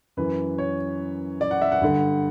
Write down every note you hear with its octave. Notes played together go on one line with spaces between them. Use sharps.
F#2 E3 B4
C#5
D5
F#5
E5
F#5
G2 D3